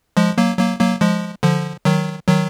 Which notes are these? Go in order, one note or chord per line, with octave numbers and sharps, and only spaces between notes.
F3 G#3
F#3 A#3
F#3 A#3
F#3 A#3
F3 G#3
D3 F3
D#3 F#3
D#3 F#3